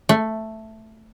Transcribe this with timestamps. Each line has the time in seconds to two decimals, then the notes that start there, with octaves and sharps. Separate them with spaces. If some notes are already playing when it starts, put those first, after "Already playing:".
0.09 A3